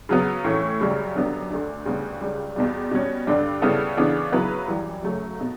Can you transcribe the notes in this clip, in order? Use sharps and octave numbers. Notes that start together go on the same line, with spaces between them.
C#3 F#3 B3
A2 E3 A3 C#4
F#2 C#3 G3
F#2 D3 G3 B3 D4
D2 D3 A3 D4
D2 C#3 G3 B3
C#2 C#3 G3
E2 B2 G3
B2 G3 C#4
G2 D3 G3 D4
C#3 G3 B3 E4 A4
C#3 E3 B3 D4
C#3 F#3 B3 E4 B4
F#2 E3 G3
F#2 C#3 F#3 A3
B2